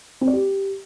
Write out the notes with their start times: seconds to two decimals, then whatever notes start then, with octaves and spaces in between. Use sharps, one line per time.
0.21 C4
0.27 D5
0.33 G4